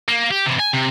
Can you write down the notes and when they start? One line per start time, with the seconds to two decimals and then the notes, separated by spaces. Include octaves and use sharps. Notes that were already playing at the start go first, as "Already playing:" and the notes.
0.08 A#3
0.31 G4
0.46 C3 E3
0.59 G#5
0.73 C3